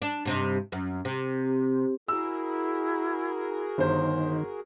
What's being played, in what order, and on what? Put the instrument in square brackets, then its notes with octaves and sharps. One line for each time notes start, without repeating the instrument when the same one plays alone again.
[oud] D4
G2 C3 D#4
F#2
C3
[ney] E4 [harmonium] F#4 G#4 A#4 [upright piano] E6
[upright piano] G1 C5 [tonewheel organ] D#3